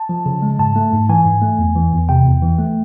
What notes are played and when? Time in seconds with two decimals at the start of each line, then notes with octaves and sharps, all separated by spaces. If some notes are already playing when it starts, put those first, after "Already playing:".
Already playing: A5
0.09 F3
0.26 C#3
0.42 G#3
0.59 G#2 A5
0.76 A3
0.93 G#2
1.09 E3 G#5
1.26 G#2
1.42 A3
1.59 E2
1.75 E3
1.92 E2
2.09 C3 G5
2.25 E2
2.42 E3
2.59 A3